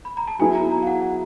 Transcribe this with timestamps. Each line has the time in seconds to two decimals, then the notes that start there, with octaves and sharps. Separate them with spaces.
0.05 B5
0.17 A#5
0.28 A5
0.39 F#3 B3 E4 G#4 G#5
0.55 A#5
0.71 A#5
0.82 F5
0.87 F#5
1.02 F#5